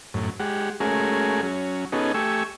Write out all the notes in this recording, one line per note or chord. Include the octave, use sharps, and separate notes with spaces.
F#2 A2
G#3 G4 F#5
G#3 A3 C#4 F#4 G#4 A#4
F#3 C#4
B3 C#4 D#4 F#4 G#4 A4
A3 G4 G#5 C#6 E6